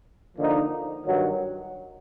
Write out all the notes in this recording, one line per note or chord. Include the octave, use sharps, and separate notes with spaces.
D3 F3 A#3 D#4
G2 D#3 F#3